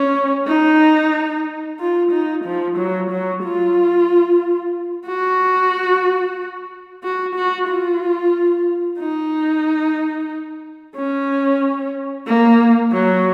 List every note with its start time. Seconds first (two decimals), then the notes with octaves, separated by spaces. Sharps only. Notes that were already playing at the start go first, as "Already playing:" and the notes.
Already playing: C#4
0.48 D#4
1.80 F4
2.12 D#4
2.45 F3
2.77 F#3
3.10 F#3
3.44 F4
5.07 F#4
7.03 F#4
7.35 F#4
7.68 F4
8.99 D#4
10.96 C#4
12.27 A#3
12.92 F#3